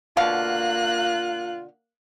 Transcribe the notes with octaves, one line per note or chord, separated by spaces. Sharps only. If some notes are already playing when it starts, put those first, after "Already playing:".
B2 D3 A#3 F4 F5 F#6